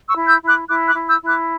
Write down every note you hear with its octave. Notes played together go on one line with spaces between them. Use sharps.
C#6 E6
E4
E6 G6
E4
D6 F#6
E4 D6 F#6
D6 F#6
E4
E6 G6
E4
D6 F#6